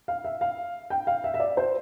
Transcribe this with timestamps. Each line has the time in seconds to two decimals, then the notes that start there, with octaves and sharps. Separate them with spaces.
0.08 F5
0.25 E5
0.41 F5
0.90 G5
1.07 F5
1.24 E5
1.34 E5
1.40 D5
1.57 C5